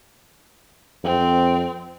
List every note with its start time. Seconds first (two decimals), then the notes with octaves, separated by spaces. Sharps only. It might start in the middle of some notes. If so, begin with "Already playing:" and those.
1.04 F2 C4